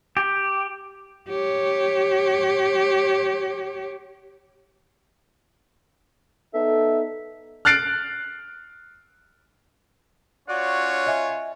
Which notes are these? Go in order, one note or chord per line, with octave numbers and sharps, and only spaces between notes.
G4
G4 C#5
B3 D#4 A4 E5
F6 F#6 A6 C7 D7
C#4 F4 F#4 C#5 D5 F#5
D#5 E5 G#5